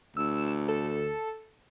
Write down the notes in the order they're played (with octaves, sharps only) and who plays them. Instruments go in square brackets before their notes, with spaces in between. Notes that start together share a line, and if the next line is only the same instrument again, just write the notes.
[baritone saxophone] D2 [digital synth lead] E6
[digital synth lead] A4